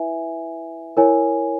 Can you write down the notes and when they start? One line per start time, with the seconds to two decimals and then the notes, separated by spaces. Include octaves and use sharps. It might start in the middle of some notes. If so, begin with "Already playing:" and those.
Already playing: E4 B4 E5 G#5
0.97 E4 A#4 C#5 G#5